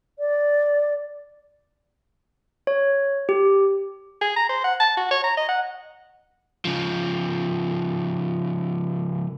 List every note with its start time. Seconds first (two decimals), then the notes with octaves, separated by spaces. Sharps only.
0.18 D5
2.67 C#5
3.29 G4
4.21 G#4
4.36 A#5
4.49 C5
4.64 F#5
4.80 A5
4.97 F#4
5.11 C#5
5.24 A#5
5.37 D#5
5.48 F#5
6.65 C#3 F3